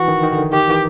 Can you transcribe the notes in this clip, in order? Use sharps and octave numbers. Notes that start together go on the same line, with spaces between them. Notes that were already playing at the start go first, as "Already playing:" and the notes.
Already playing: E3 F#4
D#3
D#3
D3
D#3 G4
E3